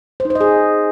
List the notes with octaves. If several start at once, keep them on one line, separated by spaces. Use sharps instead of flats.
C5
D#4
C5
D#5
G#4